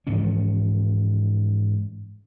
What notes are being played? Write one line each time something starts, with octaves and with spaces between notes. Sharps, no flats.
G#2 E3 F3 C#4